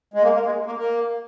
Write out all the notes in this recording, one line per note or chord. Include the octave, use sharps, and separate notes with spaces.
G#3
A#3
A#3
G#3
A#3
A#3